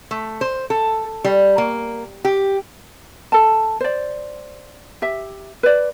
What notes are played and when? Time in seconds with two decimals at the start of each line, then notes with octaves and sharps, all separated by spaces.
0.11 A3
0.41 C5
0.70 A4
1.24 G3
1.58 A#3
2.25 G4
3.32 A4 A5
3.80 C5 D5
5.02 G4 E5
5.63 B4 D5